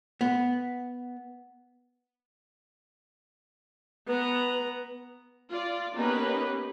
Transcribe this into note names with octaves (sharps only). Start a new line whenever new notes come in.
B3
B3 B4 A#5
F4 D5
A#3 B3 C#4 D#4 G4 B4